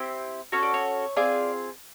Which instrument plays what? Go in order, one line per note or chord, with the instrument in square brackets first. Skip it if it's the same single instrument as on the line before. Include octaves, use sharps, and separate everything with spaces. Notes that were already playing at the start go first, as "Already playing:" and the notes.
Already playing: [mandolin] C4 E4 G4
C#4 F#4 A4 C#5
D5
C#5
C4 F4 G#4 D5